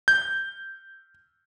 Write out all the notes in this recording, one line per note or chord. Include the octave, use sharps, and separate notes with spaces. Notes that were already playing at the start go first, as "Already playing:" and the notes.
G6